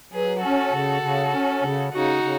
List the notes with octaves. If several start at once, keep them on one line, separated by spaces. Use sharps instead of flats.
F#3 G#4 B4
C#4 F#4 A4
C#3
C#3
C#4
C#3
C#3 D#4 F#4
C#3